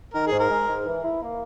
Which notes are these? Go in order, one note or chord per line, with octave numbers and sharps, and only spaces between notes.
D#3 A#4
G#2 G#4
A#4
G#3
G#2
E3
E4
A#3